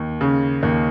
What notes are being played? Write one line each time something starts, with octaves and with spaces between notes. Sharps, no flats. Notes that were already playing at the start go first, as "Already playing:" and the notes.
Already playing: D#2
C#3
D#2